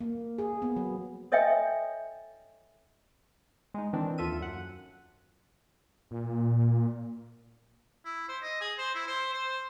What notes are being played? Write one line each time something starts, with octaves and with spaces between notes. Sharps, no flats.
A#3
G#4
B3
F#3
A4 C#5 D#5 E5 G5 G#5
G#3 D#4
D#3 E3 C4 D4
D#2 F4 A4 E5 D#7
F#2 F#5
A#2
E4
C5
D#5
G#4
C5
E4
C5
C5